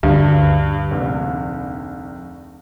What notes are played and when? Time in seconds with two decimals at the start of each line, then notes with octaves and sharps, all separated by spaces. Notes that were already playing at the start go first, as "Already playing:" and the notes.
0.03 D2 G2
0.91 F1 A#1